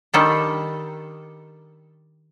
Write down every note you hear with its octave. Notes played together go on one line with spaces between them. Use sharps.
D#3 G3 D4 A4